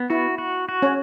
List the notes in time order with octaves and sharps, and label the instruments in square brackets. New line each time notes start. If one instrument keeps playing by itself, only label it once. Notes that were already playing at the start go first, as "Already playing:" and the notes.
Already playing: [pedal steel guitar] B3
[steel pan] E4 [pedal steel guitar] F#4
[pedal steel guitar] F#4
F#4
[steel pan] C#4 C#5